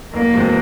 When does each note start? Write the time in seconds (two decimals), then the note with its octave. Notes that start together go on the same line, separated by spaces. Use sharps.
0.13 F#1 A#3
0.34 E2 B2 G#3 C4